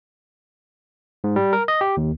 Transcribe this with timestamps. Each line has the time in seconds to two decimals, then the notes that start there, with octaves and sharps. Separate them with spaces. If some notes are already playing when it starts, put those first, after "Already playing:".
1.24 G#2
1.36 G3
1.53 A#4
1.68 D#5
1.81 G4
1.97 D#2